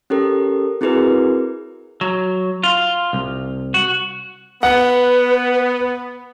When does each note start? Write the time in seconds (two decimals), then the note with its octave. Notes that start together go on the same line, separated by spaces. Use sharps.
0.10 C#4 G4 A4 A#4
0.81 C4 E4 F#4 G#4 A#4 B4
2.01 F#3
2.63 F4
3.13 C2
3.74 F#4
4.63 B3 B4 F#5